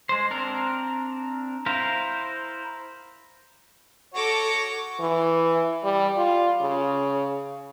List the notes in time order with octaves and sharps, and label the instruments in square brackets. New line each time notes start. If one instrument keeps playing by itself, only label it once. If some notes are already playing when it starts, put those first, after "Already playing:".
[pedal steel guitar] G#3 C5
C4 D4 A#4
E4 A#4 C5 F5
[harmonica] F#4 C#5 [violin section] A4 D6 A#6
[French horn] E3
G3
F4
C#3